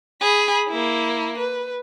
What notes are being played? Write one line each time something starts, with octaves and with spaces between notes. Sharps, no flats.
G#4 B5
A#3 E4
B4